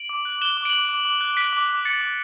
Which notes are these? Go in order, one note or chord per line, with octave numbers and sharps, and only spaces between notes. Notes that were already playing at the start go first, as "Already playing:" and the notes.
Already playing: D7 F#7
D6
F#6
F#6 E7 G7
D6
D7 F#7
D6
D6
D6
F#6
F#6 B6 D7
D6
D6
D6 A6 C#7
D6